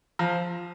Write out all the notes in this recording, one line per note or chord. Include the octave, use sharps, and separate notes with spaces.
F3